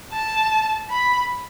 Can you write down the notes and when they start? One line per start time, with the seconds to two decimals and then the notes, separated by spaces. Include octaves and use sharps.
0.12 A5
0.91 B5